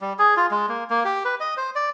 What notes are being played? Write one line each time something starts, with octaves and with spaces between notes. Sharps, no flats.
G3
G#4
F4
G#3
A#3
A#3
G4
B4
D#5
C5
D5